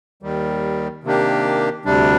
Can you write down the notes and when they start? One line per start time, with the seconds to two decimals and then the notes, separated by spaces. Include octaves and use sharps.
0.23 D#2 D#3 G3
1.04 C3 D#3 A#3 D4 G4
1.85 D2 C3 G3 D4